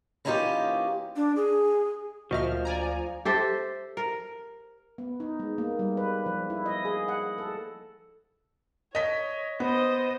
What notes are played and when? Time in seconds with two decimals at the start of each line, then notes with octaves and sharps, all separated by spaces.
0.25 E3 A#3 C#4 D#4 F4 G4
1.16 D4
1.36 G#4
2.31 D2 A#2 F3 F#4 D#5 E5 F6
2.65 D5 G#5 A#5
3.25 G4 A4 C5 E5
3.97 A#4
4.98 B3
5.20 D#4
5.40 G#3
5.58 A#3
5.79 G3
5.97 B4
6.26 F3
6.50 E4
6.66 D#5
6.85 G#4
7.08 F#5
7.38 A4
8.95 C#5 D#5 B6
9.60 B3 C5 D#5